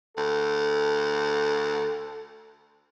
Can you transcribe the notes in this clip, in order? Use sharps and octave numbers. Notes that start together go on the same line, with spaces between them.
D2 A4